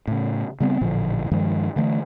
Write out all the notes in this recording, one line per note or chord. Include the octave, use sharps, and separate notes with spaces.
A2 C#3
C#3 G3 B3 C4
A1 A#2 D3 F3
G2 D#3 F3 G#3
D3 E3 A3